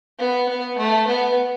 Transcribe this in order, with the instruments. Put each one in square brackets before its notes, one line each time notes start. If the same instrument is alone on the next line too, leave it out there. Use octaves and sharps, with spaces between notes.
[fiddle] B3
B3
A3
B3